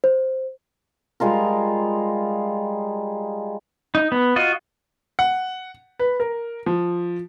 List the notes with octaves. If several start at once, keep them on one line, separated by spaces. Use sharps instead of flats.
C5
G3 G#3 F4 A#4
D#4
B3
F4 F#4 D#5
F#5
B4
A#4
F3